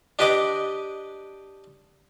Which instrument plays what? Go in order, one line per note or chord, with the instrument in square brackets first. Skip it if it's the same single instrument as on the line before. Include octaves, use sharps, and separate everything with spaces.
[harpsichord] D4 G4 B4 D#5 D6